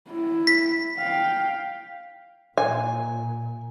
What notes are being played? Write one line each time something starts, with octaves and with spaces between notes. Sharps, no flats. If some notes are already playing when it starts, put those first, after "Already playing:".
E4
B6
F5 G5
A#2 G#5